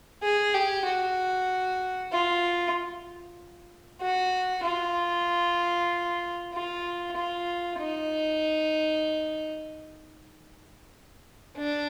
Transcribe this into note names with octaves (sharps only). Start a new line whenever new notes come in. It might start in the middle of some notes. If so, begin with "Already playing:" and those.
G#4
G4
F#4
F4
F#4
F4
F4
F4
D#4
D4